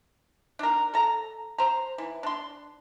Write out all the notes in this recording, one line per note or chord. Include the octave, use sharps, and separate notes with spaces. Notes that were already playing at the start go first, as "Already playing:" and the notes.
D4 A#4
A4 A#5
C5 A#5
E3
D4 C6